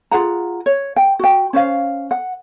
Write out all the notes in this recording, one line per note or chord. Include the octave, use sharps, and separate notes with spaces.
F4 G#4 F#5 A#5
C#5
G5
F#4 G5
C#4 C5 F5
F#5